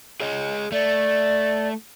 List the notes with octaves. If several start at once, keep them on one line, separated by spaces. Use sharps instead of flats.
G#4 C#5 D#5
A3 D5